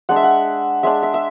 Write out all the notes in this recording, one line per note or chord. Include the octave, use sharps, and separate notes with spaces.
G#3 D4 F#5
E5
F#5
G#3 D4 E5
E5
E5